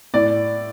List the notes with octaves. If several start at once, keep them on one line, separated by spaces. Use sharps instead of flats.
A2 D5